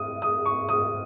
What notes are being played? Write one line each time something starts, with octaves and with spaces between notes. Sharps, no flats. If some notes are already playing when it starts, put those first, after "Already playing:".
Already playing: D#6
D#6
C#6
D#6